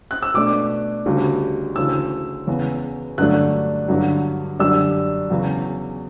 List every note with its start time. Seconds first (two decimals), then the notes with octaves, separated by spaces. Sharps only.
0.11 F#6
0.23 E6
0.34 B2 A3 D4 D6
1.06 D2 C#3 G3
1.76 D2 C#3 E3 E6
2.47 E2 C#3 E3 B3
3.18 G2 D3 F#3 A3 D4 F#6
3.88 G2 D3 F#3
4.59 F#2 D3 G3 D4 E6
5.30 E2 C#3 F#3